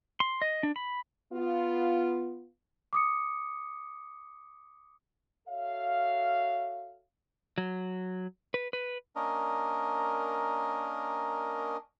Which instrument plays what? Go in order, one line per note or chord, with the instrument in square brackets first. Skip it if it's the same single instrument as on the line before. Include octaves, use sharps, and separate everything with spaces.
[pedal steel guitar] C6
D#5
D4
B5
[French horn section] B3 F4
[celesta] D6 D#6 C#7
[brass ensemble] F#4 A4 C#5 E5 F5
[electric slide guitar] F#3
B4
B4
[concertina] A#3 C#4 D4 A#4 D#5